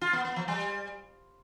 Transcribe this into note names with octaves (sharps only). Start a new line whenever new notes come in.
F4
B3
B3
F3
G3